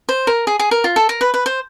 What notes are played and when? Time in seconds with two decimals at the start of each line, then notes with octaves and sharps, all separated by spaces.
0.09 C5
0.27 A#4
0.47 G#4
0.59 G#4
0.71 A#4
0.84 F4
0.96 A4
1.09 A#4
1.21 B4
1.34 B4
1.46 C5